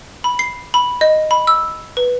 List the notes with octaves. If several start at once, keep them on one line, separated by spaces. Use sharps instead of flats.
B5
C7
B5
D#5
B5
E6
B4